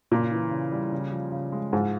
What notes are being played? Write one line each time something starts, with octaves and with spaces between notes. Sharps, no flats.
A#2 C#3
E3
C#3
G3
C#3
F3
C#3
G#3
G#2 F3